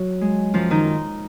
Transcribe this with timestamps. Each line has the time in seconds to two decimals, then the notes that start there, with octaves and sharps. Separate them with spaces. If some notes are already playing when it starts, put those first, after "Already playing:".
Already playing: F#3 F#4
0.21 G#3
0.54 F#2 F3 F4
0.70 D#3 D#4